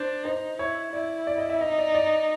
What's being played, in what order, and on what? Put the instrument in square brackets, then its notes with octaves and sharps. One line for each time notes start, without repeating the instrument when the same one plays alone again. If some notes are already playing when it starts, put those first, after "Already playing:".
Already playing: [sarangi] D4 [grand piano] C5
[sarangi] D#4 [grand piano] C5
[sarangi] E4 [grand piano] C#5
[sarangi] E4 [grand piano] D5
[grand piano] D5
D#5
E5
[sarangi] D#4 [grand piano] D#5
[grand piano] D5
D5